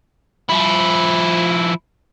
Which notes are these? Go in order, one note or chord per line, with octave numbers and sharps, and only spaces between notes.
F3 E4